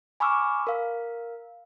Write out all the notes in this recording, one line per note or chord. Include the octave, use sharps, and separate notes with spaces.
G#5 B5 C#6 D6 E6 F6
A#4 F5